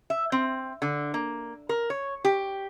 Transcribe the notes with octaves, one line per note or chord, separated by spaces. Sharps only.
E5
C4
D3
A#3
A#4
C#5
G4